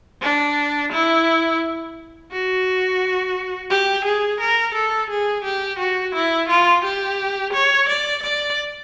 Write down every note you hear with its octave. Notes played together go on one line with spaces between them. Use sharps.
D4
E4
F#4
G4
G#4
A#4
A4
G#4
G4
F#4
E4
F4
G4
C#5
D5
D5